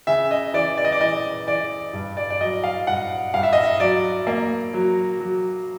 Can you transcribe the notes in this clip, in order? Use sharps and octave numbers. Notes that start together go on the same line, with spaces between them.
C#3 E5
D#5
E3 D5
D5
D#5
D5
E3 D#5
E3 D5
G2
D5
D5
F#3 D#5
F5
G2 F#5
G2 F5
E5
D#5
E5
F#3 D5
A#3
F#3
F#3